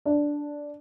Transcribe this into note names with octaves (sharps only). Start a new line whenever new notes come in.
D4